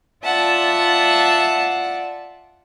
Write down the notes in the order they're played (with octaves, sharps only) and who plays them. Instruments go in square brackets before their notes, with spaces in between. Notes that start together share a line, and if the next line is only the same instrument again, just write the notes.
[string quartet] F4 D5 E5 F#5 A5